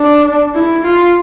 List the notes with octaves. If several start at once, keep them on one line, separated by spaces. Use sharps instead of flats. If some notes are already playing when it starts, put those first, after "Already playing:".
Already playing: D4
E4
F4